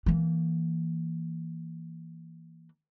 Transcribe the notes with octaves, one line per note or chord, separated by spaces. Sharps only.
E3 A#3